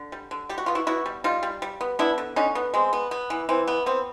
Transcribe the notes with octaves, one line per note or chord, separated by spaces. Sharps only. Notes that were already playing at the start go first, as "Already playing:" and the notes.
Already playing: D3
G3
D3
G3 G4
F#4
B3 F4
E4 F#4
B3 E4 F#4
G3
G3 D#4 F4
G3
G3
B3
B3 D4 E4
D3
D3 C#4 D#4
B3
G#3 C4
B3
B3
E3
E3 C4
B3
B3 C4